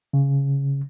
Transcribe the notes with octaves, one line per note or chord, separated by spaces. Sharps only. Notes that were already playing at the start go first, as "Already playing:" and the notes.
C#3